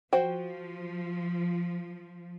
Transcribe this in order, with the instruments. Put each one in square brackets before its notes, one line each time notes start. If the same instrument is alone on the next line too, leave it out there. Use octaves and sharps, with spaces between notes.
[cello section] F3 [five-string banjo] F#4 C5 G5